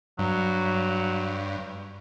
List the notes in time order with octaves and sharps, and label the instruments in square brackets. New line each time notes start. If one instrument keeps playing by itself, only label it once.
[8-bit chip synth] G2 [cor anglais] F#3